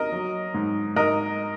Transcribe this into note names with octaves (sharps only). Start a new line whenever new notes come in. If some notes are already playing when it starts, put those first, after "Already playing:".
Already playing: A#4 D#5
F#3
G#2
G#2 A#4 D#5